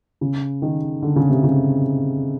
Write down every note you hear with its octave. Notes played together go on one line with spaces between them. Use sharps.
C#3
D#3
D3
C#3
C3
C#3